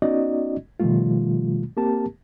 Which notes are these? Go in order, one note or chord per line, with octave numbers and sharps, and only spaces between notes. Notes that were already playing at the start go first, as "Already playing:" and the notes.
B3 C#4 D#4 F#4 D5 D#5
B2 D#3 F3 G3 A3 F4
A#3 C4 G4 A#4 A5